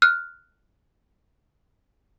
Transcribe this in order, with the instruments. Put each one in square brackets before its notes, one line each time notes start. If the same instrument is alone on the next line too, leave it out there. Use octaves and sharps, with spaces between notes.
[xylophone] F6 F#6